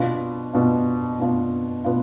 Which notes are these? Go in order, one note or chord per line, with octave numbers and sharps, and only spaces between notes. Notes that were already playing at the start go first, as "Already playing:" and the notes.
Already playing: B2 B3 D4 F4
B2 B3 D4 F4
B2 B3 D4 F4
B2 B3 D4 F4